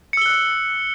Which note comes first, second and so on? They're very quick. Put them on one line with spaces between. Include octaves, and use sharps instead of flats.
C#7 E6 G7 F#6